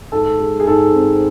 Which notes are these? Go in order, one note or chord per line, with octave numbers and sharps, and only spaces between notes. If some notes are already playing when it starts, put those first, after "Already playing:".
G#2 A4
G#3
G#4
G#2 A4
C4